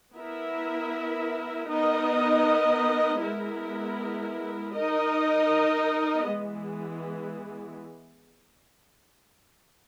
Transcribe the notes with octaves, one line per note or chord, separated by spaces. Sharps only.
B3 E4 A#4 E5
B3 D#4 A#4 D#5
G#3 B3 E4 A#4
D#4 A#4 D#5
E3 G#3 B3